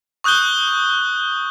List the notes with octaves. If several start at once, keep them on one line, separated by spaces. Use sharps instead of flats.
C#6 D#6 F#6 G6 G7